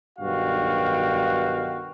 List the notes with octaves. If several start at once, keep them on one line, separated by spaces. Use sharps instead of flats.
B1 G2 D#3 F#4 F5 G5